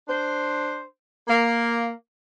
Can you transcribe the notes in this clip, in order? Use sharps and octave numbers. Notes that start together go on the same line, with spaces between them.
D4 C5
A#3